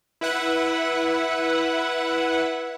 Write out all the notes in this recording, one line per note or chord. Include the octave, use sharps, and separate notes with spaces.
E4 B4 E5 F#5